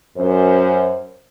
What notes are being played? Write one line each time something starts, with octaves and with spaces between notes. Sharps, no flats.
F#2 C5